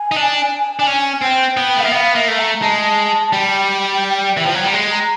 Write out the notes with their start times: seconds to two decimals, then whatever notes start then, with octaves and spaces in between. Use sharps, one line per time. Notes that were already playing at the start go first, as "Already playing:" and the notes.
Already playing: G#5
0.11 D#4
0.16 D4
0.79 D4
0.87 C#4
1.22 C4 G5
1.57 B3
1.77 A3
1.81 A#3 E5
1.92 B3 G5
1.96 F5
2.15 A#3 E5
2.28 A3
2.39 A#5
2.62 G#3 A5
3.33 G3 G5
4.37 E3
4.46 F3
4.54 F#3
4.64 G3
4.74 G#3
4.91 A#5